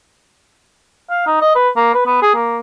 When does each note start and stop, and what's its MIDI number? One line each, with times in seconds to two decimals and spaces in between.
1.10 1.22 77
1.26 1.38 63
1.41 1.53 75
1.55 1.69 71
1.76 1.92 58
1.94 2.03 71
2.06 2.18 59
2.22 2.34 68
2.35 2.58 58